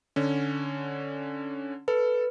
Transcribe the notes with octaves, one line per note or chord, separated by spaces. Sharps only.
D3 C#4
A4 B4